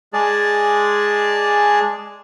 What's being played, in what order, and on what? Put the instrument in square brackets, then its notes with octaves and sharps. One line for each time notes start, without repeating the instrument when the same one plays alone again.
[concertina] G#3 G#4 D5 A5